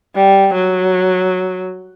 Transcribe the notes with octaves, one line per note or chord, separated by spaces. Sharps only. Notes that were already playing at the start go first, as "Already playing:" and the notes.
G3
F#3